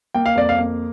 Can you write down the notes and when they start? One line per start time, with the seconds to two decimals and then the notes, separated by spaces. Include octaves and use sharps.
0.14 A#3 G5
0.26 F5
0.36 F2 D5
0.49 F5
0.58 A#3